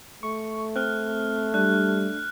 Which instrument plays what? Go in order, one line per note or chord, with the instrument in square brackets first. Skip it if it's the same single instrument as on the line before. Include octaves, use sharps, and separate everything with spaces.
[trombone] A3 [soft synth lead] C#6
[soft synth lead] C4 [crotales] F6 F#6
[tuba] G3 [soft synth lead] D4 [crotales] F#6